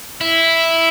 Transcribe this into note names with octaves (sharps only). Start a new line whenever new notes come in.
E4